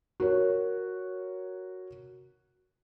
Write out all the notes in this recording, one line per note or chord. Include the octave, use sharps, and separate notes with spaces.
F#4 A#4 C#5